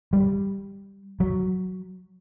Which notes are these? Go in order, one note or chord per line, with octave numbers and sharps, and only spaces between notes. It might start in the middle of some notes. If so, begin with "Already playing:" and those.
G3
F#3